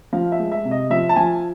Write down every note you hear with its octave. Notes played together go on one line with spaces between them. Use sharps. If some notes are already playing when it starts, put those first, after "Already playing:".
F3 F5
E5
G#3
E5
C3
D#5
F3 E5
A5
F3 G#5